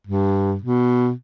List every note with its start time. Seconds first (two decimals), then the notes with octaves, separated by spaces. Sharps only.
0.07 G2
0.62 B2